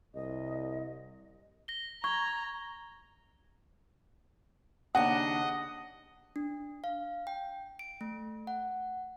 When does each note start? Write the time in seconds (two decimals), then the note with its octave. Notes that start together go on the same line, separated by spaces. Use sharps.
0.15 C2 D#5
1.68 A#6 G7
2.04 A#5 C#6 G#6 G7
4.95 D#2 C#3 D4 D#5 F#5
6.36 D4
6.84 F5
7.27 G5
7.79 D7
8.01 A3
8.47 F#5